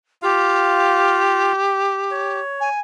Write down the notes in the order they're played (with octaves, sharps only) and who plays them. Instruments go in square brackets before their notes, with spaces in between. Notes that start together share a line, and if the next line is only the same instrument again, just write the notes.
[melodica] F4 F5 [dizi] G4
[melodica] C#5
[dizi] G#5